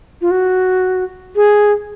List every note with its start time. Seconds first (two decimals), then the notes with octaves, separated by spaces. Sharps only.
0.21 F4
0.31 F#4
1.36 G#4